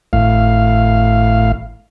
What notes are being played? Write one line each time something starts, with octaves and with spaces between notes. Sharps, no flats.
G#1 A2 F5